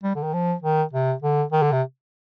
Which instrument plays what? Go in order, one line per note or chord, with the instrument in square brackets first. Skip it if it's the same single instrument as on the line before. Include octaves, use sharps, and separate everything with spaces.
[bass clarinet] G3
D3
D#3
F3
D#3
C3
D3
D#3
D3
C3